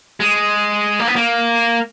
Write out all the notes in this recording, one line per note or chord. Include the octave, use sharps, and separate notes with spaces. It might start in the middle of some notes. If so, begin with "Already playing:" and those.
G#3
A#3
B3
A#3